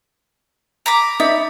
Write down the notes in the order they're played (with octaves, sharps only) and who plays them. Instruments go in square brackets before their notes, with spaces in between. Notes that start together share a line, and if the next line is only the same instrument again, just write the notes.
[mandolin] A#5 B5 D6
[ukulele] D#4 D5 E5 [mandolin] B5